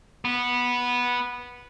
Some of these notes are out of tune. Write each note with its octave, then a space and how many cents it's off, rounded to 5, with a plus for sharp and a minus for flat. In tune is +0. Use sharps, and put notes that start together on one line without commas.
B3 -10